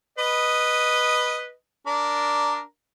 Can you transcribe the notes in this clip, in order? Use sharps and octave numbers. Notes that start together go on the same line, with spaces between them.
B4 D#5
D4 A#4